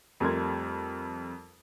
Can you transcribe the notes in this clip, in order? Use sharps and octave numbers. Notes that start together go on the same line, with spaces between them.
F2 G3 A3 A#4 C6 G#6